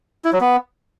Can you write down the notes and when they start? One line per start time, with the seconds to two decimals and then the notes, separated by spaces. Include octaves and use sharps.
0.25 E4
0.33 F#3
0.41 B3